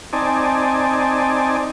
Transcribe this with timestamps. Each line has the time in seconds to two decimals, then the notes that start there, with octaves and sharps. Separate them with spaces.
0.13 C4 D#4 D5 G#5 A5